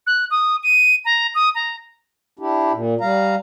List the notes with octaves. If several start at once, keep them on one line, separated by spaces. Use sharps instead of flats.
F#6
D#6
D#7
A#5
D#6
A#5
D4 E4 G4
A#2
G3 F5 A#5